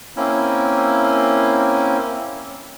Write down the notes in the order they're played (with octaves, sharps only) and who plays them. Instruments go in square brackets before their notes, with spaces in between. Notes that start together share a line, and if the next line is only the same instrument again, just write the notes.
[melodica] A#3 C4 C#4 E4